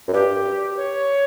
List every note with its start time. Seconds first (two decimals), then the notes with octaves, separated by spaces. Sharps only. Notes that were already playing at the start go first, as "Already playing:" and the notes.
0.08 F#2
0.13 G2 G4
0.76 C#5